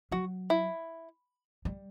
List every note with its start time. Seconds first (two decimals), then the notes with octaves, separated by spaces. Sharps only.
0.12 F#3 F#4
0.50 E4
1.65 G3